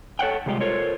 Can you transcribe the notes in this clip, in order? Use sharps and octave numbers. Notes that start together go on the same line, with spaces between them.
A4 C#5 F#5 G5
C3 G3 G#3 F4 G4 D#5
F4 A4 A#4 C5 C#5